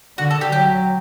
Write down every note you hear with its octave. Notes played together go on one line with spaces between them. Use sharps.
D3 F#4
A4
G4
F#3 G4